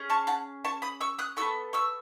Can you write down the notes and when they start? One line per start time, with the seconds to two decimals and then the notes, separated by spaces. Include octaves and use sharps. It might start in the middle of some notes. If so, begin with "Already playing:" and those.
Already playing: C#4 G#4
0.09 A5 C#6
0.27 F#5 A5
0.65 A5 C#6
0.82 B5 D#6
1.01 C#6 E6
1.19 D#6 F#6
1.37 B3 F#4 A4 C#6 E6
1.73 C#6 E6